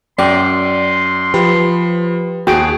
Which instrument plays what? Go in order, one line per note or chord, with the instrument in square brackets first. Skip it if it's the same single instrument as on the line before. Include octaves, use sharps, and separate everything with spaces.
[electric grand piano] F#2 [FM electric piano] D5 [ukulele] G5 [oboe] C6
[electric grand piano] F3 [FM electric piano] G4 B4
[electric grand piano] D#2 G#4 D7 [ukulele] F#4 [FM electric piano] G5